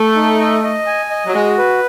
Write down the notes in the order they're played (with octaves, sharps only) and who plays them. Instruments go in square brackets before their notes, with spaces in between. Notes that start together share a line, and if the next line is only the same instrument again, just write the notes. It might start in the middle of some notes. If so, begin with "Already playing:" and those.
Already playing: [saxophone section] A3 [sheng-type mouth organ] A4
[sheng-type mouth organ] D#4
D#5
D#5
G#5
D#5
[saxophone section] F#3
[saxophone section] G#3 [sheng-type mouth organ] F#4
[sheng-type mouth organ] B4